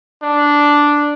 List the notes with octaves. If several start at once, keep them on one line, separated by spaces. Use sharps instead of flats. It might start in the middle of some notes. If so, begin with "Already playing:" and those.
D4